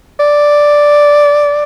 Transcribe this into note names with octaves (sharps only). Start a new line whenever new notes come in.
D5